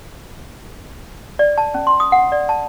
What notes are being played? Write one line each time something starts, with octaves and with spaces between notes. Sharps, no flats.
D5
A5
C#4
C6
D#6
F#5
D5
A5